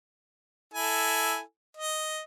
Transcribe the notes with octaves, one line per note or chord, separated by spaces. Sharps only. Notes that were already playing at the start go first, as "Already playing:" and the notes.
E4 A4 G#5
D#5